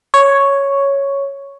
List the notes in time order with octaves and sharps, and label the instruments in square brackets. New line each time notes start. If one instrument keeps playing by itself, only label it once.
[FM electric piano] C#5